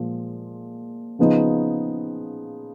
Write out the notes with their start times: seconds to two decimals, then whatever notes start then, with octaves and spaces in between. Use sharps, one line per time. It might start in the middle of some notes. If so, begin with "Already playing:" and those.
Already playing: A#2 F3 G#3
1.19 C#3 F3 B3 D#4